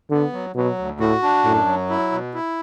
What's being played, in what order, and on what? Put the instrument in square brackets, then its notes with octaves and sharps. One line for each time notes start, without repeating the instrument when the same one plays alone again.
[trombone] D3 [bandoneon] B3
[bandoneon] F#3
[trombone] B2 [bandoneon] F#3
[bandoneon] D2
[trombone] A2 [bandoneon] F#4
[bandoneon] D4
[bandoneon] F#2 [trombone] A2
[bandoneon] F#3
E4
B2
E4